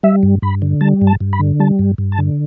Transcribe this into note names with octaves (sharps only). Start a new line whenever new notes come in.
G3 E5
G2
G2 B5
D3
G3 A5
G2
A5
G2
B5
D3
G3 A5
G2
G2
A5
D3